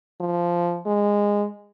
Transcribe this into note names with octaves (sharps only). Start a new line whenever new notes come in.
F3
G#3